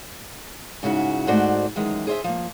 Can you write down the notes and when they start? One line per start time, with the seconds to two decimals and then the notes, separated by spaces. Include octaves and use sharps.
0.83 G#2 C#3 E4 F#4
1.27 G#2 A3 F#4 C5 D5
1.76 F#2 D#3 E3 G#3
2.07 G#4 C5 D#5 E5
2.24 F3 A#3